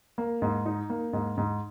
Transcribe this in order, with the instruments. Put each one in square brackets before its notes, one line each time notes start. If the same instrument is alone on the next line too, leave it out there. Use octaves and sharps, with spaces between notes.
[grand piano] A#3
G#2
D#4
A#3
G#2
G#2